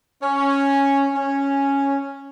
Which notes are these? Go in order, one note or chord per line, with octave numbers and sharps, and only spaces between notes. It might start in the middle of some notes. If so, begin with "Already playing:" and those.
C#4
C#4